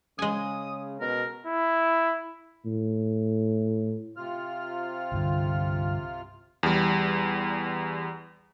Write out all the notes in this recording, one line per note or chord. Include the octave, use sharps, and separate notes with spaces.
C#3 G#3 G#5 D#6
B2 A#4
E4
A2
C3 F4 F6
C2 G2 D3
E2 G3